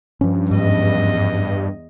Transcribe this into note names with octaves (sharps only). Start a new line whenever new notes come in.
G2 F3 C#4
E2 G#2 D#5